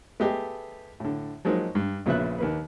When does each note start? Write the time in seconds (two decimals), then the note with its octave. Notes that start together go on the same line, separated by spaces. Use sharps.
0.20 A3 B3 G4 G#4 D#5
1.00 A2 D3
1.45 F3 F#3 G#3 A#3 D#4
1.75 G2
2.06 A#1 A#2 C#3 B3 E5 F#6
2.38 D#2 A#3 B4